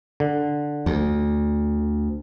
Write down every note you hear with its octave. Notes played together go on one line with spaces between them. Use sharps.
D3
D2